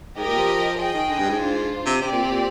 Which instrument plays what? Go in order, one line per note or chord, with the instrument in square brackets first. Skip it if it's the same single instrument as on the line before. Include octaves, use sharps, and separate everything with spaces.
[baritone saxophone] G#2 [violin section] G4 A#4 D#5
[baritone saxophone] A#2
F3
[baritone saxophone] F3 [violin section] G#4 D#5 G5
[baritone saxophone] D#3
D3
G2
G#2
[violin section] D4 F4 C5
[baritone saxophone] C3
[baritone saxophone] C3 [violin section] C4 G4 D5
[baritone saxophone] A#2
C3
A#2